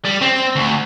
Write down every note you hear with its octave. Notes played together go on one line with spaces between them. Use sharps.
G3
C4
D2